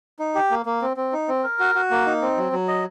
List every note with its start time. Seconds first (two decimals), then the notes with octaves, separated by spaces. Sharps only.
0.19 D#4
0.35 G4
0.51 A#3
0.66 A#3
0.82 C4
0.97 C4
1.13 D#4
1.28 C4
1.44 A#4
1.60 F#4
1.75 F#4
1.91 A#3
2.06 D#4
2.22 C4
2.37 F#3
2.52 F#3
2.68 D#5